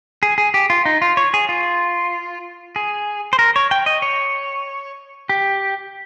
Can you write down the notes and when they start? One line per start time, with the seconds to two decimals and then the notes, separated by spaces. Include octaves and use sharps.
0.23 G#4
0.38 G#4
0.54 G4
0.70 F4
0.86 D#4
1.02 F4
1.17 C#5
1.34 G#4
1.49 F4
2.76 G#4
3.33 C5
3.39 A#4
3.56 C#5
3.71 G5
3.86 D#5
4.02 C#5
5.29 G4